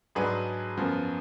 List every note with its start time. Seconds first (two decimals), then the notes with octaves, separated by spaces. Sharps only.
0.15 G#2 F#3 D4 G#4 B4
0.77 F#2 F3 B3